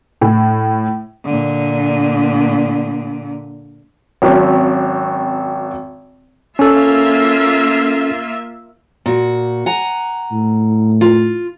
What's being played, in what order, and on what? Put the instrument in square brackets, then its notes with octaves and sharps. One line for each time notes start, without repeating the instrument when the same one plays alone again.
[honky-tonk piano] A2
[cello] A#2 D3
[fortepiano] G#1 F#3 C4 C#4
[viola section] A#3 F4 E5 [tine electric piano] C#4 A4
[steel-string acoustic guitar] A#2 F#4
F#5 G#5 A#5
[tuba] A2
[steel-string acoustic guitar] F4